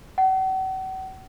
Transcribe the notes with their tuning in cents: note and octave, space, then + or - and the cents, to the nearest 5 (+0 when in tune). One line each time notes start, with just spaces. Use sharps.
F#5 +40